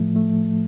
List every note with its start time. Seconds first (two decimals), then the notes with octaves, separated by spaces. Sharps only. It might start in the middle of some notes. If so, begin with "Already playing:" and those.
Already playing: A2 F3 A3
0.16 A3